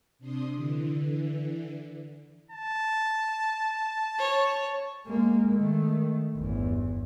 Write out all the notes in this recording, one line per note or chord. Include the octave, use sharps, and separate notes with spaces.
C3 D4 C6 D#6
D3 E3
A5
C#5
G#3 A#3
D#3 A3
G1 E2